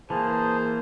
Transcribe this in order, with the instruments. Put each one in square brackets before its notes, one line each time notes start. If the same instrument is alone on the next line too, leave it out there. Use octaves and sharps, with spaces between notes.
[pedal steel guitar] E3 A#3 [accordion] G#4 A5 [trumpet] C5